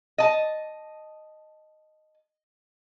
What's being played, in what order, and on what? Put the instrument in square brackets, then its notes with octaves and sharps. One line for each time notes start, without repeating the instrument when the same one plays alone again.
[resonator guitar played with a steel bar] D#5 A5